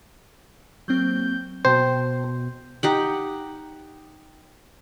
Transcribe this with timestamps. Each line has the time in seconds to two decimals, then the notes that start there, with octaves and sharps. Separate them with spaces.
0.88 F#3 A#3 C4 G6
1.65 B2 C5 G5 A5
2.83 D#4 G4 F#5